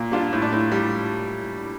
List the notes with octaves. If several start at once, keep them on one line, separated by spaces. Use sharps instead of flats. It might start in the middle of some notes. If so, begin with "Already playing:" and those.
Already playing: A#2
G3 D4 F4
A2
D4
A2
G3